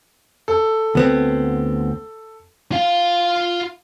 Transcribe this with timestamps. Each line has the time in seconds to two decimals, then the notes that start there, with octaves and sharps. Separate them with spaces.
0.48 A4
0.95 D2 B3 C4
2.72 F4 F5